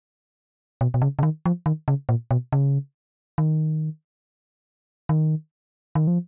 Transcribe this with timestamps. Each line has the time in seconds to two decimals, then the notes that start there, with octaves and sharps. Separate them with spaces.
0.81 B2
0.94 B2
1.02 C#3
1.19 C#3
1.23 D#3
1.46 F3
1.66 D#3
1.88 C#3
2.09 A#2
2.31 B2
2.53 C#3
3.38 D#3
5.09 D#3
5.95 D#3
6.07 F3